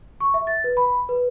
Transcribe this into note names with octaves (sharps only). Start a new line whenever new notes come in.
C#6
E5
A6
B4
B5
B4